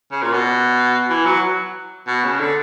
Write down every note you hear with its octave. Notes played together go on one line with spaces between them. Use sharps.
C#3
A#2
B2
E3
F#3
B2
C#3
D3